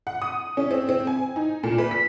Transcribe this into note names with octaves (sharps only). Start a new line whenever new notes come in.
F#5
D#6
C#4
C4
C4
G#5
D#4
A#2
B4
B6